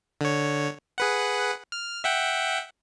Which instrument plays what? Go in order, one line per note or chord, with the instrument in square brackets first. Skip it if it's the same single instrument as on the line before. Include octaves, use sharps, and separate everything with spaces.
[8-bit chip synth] D3 C#5
G#4 B4 F#5
F6
E5 F#5 G5